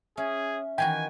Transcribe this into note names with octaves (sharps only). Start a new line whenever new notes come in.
C#4 G#4 E5
D#3 E3 F#4 G5 G#5